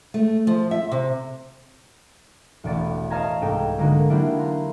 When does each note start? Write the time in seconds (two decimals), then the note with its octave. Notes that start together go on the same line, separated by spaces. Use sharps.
0.14 A3
0.47 F3
0.71 E5
0.91 C3
2.64 E1 A1 D5 A6
3.10 C#5 D#5 F5 A5 A#5 G#6
3.42 C2 G#2 D#4 A4 G5
3.79 D3 G#3 A#3 D#4 F#4 A#4
4.09 F#3 A#3 D4 E4 F4 G4
4.39 A#5 C6